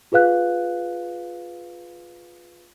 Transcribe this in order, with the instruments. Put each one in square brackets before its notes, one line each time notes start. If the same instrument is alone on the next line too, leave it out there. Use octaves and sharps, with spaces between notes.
[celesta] F4 G#4 B4 F5 F#6